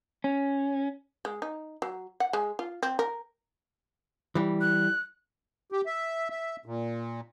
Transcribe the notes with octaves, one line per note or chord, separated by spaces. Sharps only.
C#4
G#3
D#4
F#3
F#5
G#3
F4
C4
A#4
E3 G3
F#6
G4
E5
E5
A#2